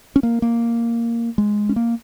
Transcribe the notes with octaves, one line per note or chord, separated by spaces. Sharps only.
C#4
A#3
A#3
G#3
C#4
A#3